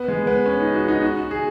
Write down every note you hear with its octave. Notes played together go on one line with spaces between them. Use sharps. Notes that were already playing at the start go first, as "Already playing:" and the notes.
Already playing: B3
G#3
B3
C#4
D#4
F#4
D#4
F#4
G#4